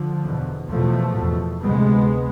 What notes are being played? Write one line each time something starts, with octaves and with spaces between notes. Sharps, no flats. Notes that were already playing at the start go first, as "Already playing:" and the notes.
Already playing: D3 F3
E2 B2
E2 B2 F3 A3
E2 B2
D2 C3 G#3 B3